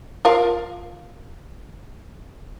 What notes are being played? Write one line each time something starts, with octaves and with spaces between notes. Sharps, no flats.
F4 A#4 F5